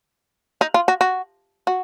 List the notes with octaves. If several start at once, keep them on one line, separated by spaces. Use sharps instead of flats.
D#4
F4
F#4
F#4
F#4